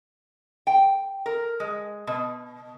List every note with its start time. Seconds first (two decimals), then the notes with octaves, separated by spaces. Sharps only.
0.67 G5
1.26 A#4
1.60 G#3
2.07 B2